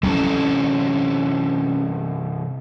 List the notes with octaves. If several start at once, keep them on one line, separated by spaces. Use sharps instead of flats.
C3 E3 F#3 C#4 A4